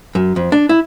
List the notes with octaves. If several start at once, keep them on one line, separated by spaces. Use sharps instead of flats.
F#2
F2
D4
E4